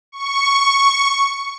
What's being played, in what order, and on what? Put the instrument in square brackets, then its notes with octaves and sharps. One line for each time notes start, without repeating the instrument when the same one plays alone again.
[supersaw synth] C#6